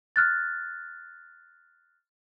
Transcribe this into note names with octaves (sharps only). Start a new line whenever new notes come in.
F6 F#6 A6